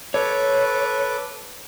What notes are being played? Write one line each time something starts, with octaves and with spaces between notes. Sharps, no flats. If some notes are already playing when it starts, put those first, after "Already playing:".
A4 B4 C#5 D6